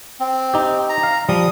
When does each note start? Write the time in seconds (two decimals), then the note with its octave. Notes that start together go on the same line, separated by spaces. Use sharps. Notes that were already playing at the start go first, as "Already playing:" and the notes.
0.20 C4
0.54 D#4 G4
0.89 A#5
1.03 F5
1.29 F3 G3 D#6